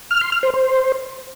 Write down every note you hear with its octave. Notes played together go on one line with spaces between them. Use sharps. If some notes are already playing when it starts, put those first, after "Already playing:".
F6
C6
F6
C5
C5